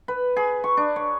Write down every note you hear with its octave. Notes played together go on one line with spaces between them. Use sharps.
B4
G#4
C#6
D4
C#5